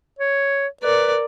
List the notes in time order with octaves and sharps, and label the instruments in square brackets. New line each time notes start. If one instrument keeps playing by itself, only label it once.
[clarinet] C#5
[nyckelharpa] A#4 D5 [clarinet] B4